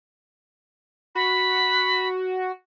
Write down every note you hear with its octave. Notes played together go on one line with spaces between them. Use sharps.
F#4 B5